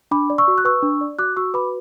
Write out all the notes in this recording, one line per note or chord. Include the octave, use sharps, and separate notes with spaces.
D4 B5 D6
D5
C#6 E6
F#4
F#6
B4 C#6 E6
D4
D5
F#4 D6 F#6
F#4 C#6 E6
B4 B5 D6